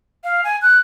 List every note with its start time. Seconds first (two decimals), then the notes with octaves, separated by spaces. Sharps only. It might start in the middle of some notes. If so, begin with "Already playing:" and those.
0.24 F5
0.44 G#5
0.62 F#6